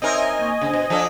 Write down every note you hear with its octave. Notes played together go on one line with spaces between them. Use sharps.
C4 D#4 A#4 C#5 D#5 E5 G#5
A#3 C#6
C#3 D4 C5
B2 C5
F3 D4 A4 A5 D#6